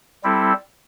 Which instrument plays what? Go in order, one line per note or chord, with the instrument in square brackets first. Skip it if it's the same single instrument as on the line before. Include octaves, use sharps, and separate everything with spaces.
[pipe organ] G3 C4 E4 A4